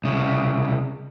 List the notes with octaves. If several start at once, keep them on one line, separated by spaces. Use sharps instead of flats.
C2 C#3